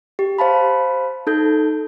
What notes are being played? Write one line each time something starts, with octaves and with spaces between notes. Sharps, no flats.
G4
C5 F5 A5 B5
D#4 A4 G6